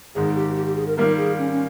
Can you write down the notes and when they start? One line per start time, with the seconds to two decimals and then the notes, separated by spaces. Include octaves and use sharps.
0.15 G#1 G#2 D#3 G#4
0.36 G4
0.56 G4
0.67 G4
0.76 G#4
0.87 A#4
0.97 D#3 G3 A#3 F4 A#4
1.17 G#4
1.38 C#4
1.52 C#4